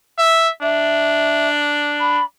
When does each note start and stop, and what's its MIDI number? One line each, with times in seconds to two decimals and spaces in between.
0.18 0.48 76
0.62 2.20 62
0.62 1.48 76
2.00 2.23 83